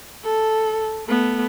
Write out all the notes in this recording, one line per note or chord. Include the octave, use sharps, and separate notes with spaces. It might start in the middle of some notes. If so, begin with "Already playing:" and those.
A4
A3 B3